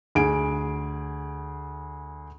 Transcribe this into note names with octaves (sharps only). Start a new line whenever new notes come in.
D2 G#4 D7